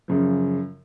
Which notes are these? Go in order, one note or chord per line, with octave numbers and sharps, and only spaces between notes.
F#2 C#3 F3